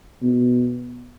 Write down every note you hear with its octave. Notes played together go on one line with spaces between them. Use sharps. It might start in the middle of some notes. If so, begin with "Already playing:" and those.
B2